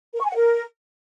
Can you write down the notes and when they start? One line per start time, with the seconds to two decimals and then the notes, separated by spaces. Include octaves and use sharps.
0.15 A#4
0.20 C#6
0.25 G#5
0.30 F#5
0.35 A#4